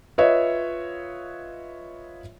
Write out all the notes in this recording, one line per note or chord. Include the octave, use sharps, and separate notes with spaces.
F4 B4 C#5 D#5 E5